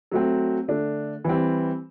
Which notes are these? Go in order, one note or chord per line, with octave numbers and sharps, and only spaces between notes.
F#3 A3 C4
D3 A3 D4
E3 G3 C4